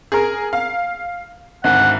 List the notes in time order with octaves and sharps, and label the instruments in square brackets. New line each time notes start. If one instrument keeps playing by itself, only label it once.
[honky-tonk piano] G#4 A#4
F5
[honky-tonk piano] G#1 D2 [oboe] F#5